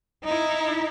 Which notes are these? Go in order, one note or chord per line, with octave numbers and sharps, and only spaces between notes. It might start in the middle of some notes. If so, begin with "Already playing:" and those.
D#4 E4